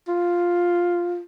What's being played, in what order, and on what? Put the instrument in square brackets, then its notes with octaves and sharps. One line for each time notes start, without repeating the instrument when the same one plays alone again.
[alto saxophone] F4